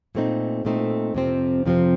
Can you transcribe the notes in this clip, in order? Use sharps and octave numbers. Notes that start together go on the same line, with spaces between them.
A#2 A3 C4 D#4
A#2 A3 C4 D#4
F2 C3 F3 C4
F2 C3 F3 C4